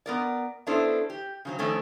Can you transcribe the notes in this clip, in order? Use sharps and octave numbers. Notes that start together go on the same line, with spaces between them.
B3 A#4 D5
B3 C#4 D4 E4 A4 C5
G4
C#3 F#3 C4
F2 D#3 A3 C4 C#4